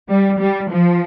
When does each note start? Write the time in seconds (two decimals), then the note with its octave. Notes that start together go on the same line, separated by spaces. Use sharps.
0.09 G3
0.40 G3
0.70 F3